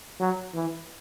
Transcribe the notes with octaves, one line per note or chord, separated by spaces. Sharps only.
F#3
E3